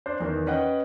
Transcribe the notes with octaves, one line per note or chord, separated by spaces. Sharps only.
D4 C5
E2 D#3
C#4 B4 D#5 F#5 G5